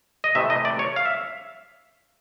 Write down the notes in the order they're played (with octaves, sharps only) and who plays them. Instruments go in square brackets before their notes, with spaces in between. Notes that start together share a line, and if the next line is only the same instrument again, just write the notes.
[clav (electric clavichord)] D#5
C3 E3 A3 E5
D#5
D5
C#5
F5
E5